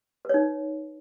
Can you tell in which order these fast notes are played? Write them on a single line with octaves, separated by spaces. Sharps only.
B4 C#5 D#4